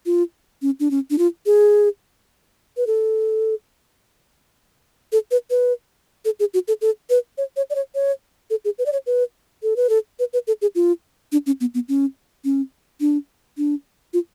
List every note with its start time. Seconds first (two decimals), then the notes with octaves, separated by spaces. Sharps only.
0.06 F4
0.62 C#4
0.80 D4
0.91 C#4
1.10 D4
1.18 F4
1.46 G#4
2.77 B4
2.87 A4
5.12 A4
5.31 B4
5.50 B4
6.25 A4
6.40 G#4
6.54 F#4
6.68 A4
6.82 A4
7.10 B4
7.38 C#5
7.57 C#5
7.70 D5
7.75 C#5
7.95 C#5
8.50 A4
8.65 G#4
8.79 B4
8.86 D5
8.93 C#5
9.06 B4
9.63 A4
9.76 B4
9.89 A4
10.19 B4
10.33 B4
10.47 A4
10.62 G#4
10.75 F4
11.32 D4
11.46 C#4
11.61 B3
11.74 B3
11.89 C#4
12.45 C#4
13.01 D4
13.57 D4
14.13 F4